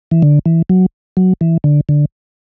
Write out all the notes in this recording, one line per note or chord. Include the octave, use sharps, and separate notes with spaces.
E3
D3
E3
F#3
F#3
E3
D3
D3